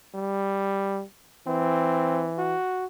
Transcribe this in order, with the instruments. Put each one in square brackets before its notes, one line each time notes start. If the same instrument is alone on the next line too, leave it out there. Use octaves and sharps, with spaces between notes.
[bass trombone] G3
[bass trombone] E3 [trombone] C4
[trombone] F#4